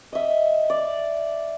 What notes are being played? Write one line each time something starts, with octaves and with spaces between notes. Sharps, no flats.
D#5 E5
D5